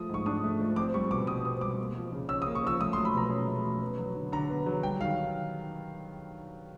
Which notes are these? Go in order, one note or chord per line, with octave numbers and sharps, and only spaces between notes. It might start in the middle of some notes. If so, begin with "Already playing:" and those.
Already playing: F3 A3 D#6
G#2 C#6
D4 D#6
A3
F3
C4 D6
G3 C#6
B2 D6
B2 D#6
C4 D#6
G3 D6
A#3
F3
C#3
C#4 E6
D#6
A#3
C#6
F3 E6
A3 D#6
C6
F#3
B5
B2 A#5
C#4
A3
F#3
B3
F#3
D3
D3 A#5
B3
F#3
G3 G5
D#3 F5